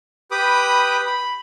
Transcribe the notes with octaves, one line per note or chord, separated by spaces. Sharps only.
G4 B4 B5 D6 D#6
B5